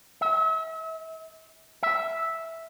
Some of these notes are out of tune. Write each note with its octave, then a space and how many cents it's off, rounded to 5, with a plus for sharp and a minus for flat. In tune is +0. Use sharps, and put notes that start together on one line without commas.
E5 -40
E5 -5